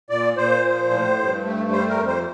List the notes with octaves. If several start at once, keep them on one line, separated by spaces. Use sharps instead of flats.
A#2 D5
A#2 C5
F3
A2
G2
A3
G3 C5
A#4
F2
C5